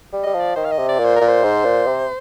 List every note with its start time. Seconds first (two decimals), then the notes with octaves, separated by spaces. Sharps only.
0.13 G3
0.23 G3 D#5
0.34 F3
0.39 D5
0.56 D#3 C5
0.65 F5
0.72 D#5
0.78 C3
0.89 D5
0.99 A#2
1.05 C5
1.16 A#2 A#4
1.28 C5
1.43 G#2
1.64 A#2
1.87 C3